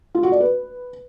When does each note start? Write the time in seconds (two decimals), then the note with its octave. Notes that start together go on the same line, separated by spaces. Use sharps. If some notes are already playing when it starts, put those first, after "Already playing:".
0.15 F4
0.23 F#4
0.32 D5
0.40 B4